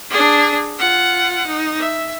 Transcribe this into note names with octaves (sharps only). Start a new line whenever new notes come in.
D4 G#4
F4 F#5
D#4
E5